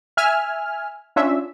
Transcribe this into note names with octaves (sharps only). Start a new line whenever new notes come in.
E5 G#5 F6
C#4 D4 F4 E5